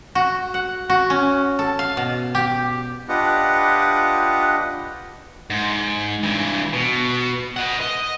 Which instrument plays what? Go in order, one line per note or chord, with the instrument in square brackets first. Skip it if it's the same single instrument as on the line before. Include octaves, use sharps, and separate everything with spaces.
[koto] F#4
F#5
F#4
C#4
A4
F5
B2
G4
[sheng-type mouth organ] D4 F4 G4 B4 D#5 F#5
[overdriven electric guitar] G#2
G2 E3
B2
D#5 F#5
D#5